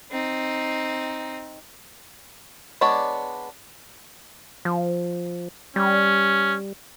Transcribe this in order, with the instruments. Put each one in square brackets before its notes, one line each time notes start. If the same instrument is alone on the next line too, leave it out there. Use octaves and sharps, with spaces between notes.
[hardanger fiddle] C4 D#4
[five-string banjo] G#3 B3 D4 C#5 D5
[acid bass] F3
[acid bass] G3 [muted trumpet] C#4